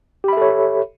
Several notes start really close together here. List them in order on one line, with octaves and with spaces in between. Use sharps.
G4 B5 E5 A4 C#5